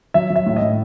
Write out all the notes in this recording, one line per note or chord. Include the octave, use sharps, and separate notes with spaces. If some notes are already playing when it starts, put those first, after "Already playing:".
F#3 E5
F#3
E5
A2
D#5
A2